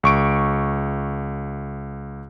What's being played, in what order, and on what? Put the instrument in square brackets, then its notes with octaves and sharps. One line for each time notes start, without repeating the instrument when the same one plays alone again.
[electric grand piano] C#2 C#6 D7